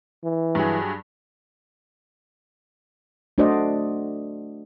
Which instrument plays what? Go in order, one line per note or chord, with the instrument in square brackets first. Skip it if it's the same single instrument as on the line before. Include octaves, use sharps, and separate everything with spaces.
[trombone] E3
[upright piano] G2 F#3 G#4
[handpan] A3 D4 F#4 C5 D5 D#5